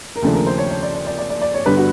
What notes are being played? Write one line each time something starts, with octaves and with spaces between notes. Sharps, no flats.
A#4
D#2 C#3 F3 A3 D4 A4
A#4
C5
C#5
C#5
D5
D5
D5
D5
D5
D5
C#5
G2 D3 G3 B3 D4 B4
F#4